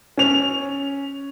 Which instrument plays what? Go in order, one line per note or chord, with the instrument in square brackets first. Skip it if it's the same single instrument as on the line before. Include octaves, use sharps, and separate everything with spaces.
[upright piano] C#4 F7